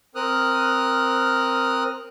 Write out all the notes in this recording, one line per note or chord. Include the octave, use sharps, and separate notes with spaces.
C4 A#4 D#6 F6 F#6